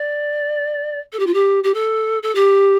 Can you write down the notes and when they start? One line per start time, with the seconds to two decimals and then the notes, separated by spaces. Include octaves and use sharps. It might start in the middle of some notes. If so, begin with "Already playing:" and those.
Already playing: D5
1.12 A4
1.19 G4
1.26 F4
1.33 G4
1.63 G4
1.74 A4
2.22 A4
2.35 G4